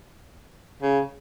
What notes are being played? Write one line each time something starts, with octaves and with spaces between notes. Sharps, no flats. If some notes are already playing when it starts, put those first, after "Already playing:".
C#3